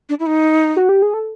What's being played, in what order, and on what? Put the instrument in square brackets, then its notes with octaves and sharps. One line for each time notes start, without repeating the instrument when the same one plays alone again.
[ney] D4
E4
D#4
[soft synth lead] F#4
G4
G#4
A4